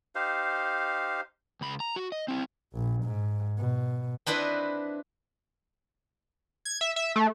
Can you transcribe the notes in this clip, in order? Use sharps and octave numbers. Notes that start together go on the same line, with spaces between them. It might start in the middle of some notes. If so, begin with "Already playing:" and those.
D#4 G4 C5 F5
C#2 B5
A#5
F#4
D#5
C4 E4
A#1
G#2
B2
C4 D4 E4 B4 D#5
G#6
E5
E5
A3